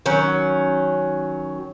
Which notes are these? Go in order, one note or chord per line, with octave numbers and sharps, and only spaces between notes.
D#3 F#3 C#4